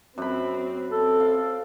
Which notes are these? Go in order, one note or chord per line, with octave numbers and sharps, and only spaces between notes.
F#2 C4 B5
C4 A4
F5